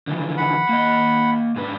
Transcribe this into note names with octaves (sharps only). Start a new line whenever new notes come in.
D3 E3 F3
F#5 B5
A#3 D#5
G#2 D4 B4